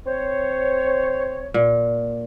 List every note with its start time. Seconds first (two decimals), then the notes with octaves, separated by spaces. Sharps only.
0.06 C4 C5 C#5
1.54 A#2